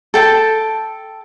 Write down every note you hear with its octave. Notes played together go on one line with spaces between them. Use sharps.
A4 G5 A5